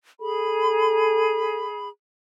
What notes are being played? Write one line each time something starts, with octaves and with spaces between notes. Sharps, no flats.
G#4 A4 B5